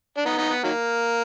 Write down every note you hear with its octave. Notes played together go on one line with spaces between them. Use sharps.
D4
B3 D#4
B3 D#4
B3
D#3 F#3 A#3